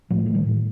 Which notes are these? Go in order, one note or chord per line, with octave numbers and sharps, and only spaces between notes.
A2 F3 A3
A3
D#3 G3
A2